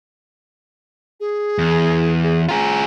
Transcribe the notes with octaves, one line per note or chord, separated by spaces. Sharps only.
G#4
E2
G#4
F4 G#4 A#5